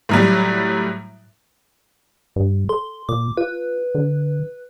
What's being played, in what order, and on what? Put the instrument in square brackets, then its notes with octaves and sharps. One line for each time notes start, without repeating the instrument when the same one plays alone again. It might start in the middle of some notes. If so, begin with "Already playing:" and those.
[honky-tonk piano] A2 F#3 G3
[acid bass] G2
[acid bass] A4 [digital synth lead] C6
[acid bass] A#2 [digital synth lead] D6
[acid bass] F4 [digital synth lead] B4
[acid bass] D3